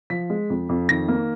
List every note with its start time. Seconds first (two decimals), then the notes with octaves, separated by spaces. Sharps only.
0.10 F3 B6
0.30 G#3
0.50 F2
0.69 F2
0.89 D#3 A#6
1.08 A#3